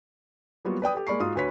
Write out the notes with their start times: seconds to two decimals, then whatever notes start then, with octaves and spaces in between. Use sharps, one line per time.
0.65 F#3 G3 A#3 B3 F4 F#4
0.82 B4 D5 G5 D#6
0.95 G4 A4
1.07 G#3 A#3 D5 B5 C#6 C7
1.20 G#2 F4 F#4 F5 D#6
1.35 D2 F#4 B4 C#5 B6